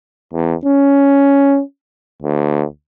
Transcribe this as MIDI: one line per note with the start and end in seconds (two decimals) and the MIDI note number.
0.33 0.54 40
0.65 1.61 61
2.22 2.64 38